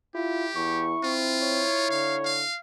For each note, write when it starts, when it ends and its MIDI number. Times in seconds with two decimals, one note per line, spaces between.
0.15 0.51 64
0.15 0.45 65
0.15 0.87 67
0.56 0.95 40
0.56 2.52 64
0.56 1.13 85
1.04 1.67 60
1.04 1.89 65
1.42 2.41 73
1.90 2.45 50
1.90 2.16 77
2.25 2.58 77